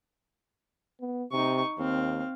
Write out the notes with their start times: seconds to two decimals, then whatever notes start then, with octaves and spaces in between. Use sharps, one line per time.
1.01 B3
1.32 C3 D#4 C#6
1.78 D#2 C4 F5